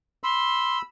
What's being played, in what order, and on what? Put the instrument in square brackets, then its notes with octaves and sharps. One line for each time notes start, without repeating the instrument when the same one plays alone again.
[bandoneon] B5 E6 [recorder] C6